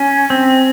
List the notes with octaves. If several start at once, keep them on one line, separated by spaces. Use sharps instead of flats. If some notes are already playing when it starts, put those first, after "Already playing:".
Already playing: C#4
C4